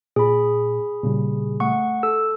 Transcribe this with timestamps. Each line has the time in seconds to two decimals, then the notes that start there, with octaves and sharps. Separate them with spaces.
0.16 A#2 G#4 B5
1.03 A#2 C#3 G3
1.60 A3 F#5 C#6
2.03 A4 E6